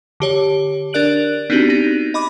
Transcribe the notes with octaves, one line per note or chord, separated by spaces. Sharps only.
D3 G4 C#5
D4 A#4 D5 F#6 D7 F#7
B3 C4 D4 D#4 F#4 G4
D#4
D#5 B5 D6